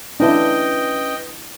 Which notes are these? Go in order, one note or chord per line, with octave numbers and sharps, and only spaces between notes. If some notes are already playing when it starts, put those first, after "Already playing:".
C#4 D4 E4 B4 D#5 G5 A5